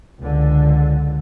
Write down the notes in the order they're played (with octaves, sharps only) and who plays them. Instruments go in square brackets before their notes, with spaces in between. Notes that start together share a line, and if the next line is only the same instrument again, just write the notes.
[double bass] C#2 D3